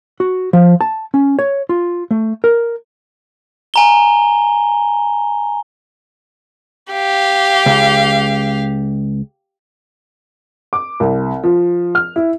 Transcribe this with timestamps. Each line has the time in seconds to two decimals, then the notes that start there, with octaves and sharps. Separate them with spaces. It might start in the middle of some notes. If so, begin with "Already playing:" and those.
0.20 F#4
0.53 F3
0.81 A5
1.14 C#4
1.39 C#5
1.69 F4
2.11 A3
2.44 A#4
3.74 G#5 A#5 G7
6.92 G4 F5
7.66 C#2
10.73 D6
11.00 C2
11.43 F3
11.95 F6
12.16 E4